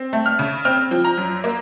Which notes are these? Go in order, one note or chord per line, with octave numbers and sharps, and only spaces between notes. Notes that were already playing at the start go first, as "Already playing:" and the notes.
Already playing: C4
A3
F6
C#3
C4 F6
F3
A#5
F#2
A#3